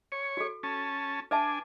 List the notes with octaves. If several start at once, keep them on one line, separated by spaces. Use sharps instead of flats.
C#5
F#4 A4
C#4 A5
D4 B4 E5 G#5 A5